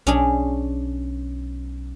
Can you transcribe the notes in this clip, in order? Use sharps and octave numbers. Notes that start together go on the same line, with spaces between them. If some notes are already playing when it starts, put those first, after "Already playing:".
B1 C#4 D4 G#4